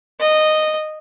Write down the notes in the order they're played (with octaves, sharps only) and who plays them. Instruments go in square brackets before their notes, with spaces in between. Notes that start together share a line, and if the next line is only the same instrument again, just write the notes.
[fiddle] D#5